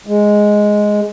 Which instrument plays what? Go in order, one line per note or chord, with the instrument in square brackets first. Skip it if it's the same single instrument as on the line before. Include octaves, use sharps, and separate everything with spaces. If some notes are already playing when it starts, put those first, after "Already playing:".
[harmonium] G#3